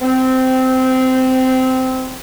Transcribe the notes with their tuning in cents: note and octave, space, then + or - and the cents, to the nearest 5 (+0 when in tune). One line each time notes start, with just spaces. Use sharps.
C4 -15